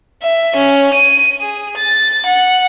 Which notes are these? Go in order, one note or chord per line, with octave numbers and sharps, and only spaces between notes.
E5
C#4
D#7
G#4
A6
F#5